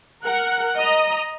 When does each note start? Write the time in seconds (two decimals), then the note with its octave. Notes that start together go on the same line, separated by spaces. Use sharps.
0.24 A#4 F#5
0.77 D#5 A#5